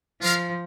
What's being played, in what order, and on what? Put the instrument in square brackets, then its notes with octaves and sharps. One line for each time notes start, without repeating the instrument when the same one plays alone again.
[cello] F3 [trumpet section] F4 A#4 F5